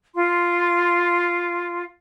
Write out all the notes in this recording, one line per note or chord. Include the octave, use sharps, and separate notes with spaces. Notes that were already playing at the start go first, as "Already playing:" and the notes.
F4 C6